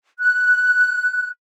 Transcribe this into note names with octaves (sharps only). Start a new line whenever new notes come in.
F#6